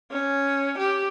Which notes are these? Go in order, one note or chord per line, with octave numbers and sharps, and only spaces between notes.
C#4
G4